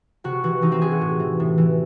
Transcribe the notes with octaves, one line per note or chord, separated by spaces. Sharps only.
C3 F#4
E3 F#4
E3 D#4
C4
C3 G#4
F#4
A2
E3
A2
E3